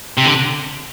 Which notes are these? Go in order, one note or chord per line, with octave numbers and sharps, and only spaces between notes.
C3
D3